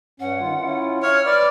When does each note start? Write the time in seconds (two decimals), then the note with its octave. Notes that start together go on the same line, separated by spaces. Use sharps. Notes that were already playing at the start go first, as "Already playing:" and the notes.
0.20 G2 C#4 F#5
0.41 D#3 F4
0.62 C#4 E4 F4
1.03 C#5 E5 F6
1.26 B4 D5